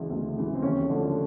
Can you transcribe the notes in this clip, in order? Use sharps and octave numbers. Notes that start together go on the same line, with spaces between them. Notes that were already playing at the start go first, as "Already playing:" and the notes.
Already playing: D2 C#3 E3 G#3
D2
C#3 E3 G#3
C4
D#2 C#4
D3 F3 A3